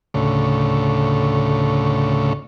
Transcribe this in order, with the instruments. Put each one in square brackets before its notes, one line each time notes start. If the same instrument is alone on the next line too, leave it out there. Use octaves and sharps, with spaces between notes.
[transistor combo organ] D2 A2 C#3